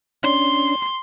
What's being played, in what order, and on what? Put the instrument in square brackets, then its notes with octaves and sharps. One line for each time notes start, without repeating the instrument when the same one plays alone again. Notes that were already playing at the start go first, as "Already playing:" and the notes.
[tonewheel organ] C#4 D4 [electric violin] C6